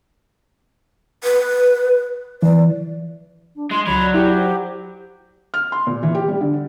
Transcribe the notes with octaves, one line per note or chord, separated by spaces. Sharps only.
B4
E3 D5
D4
G#3 F4 C6
C#2 F#3 B5 D6
D5
E4 G4
C5
F6
C6
A#2
E3
G4
G3
D3
D4